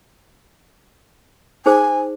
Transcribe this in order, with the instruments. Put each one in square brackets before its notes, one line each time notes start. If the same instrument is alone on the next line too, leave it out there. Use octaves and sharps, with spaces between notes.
[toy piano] D#4 G#4 C5 [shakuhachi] G#5